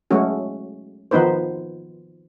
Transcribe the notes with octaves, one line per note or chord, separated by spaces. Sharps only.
F#3 G#3 A3 C#4 F#4
D#3 F3 B3 D#4 B4 C5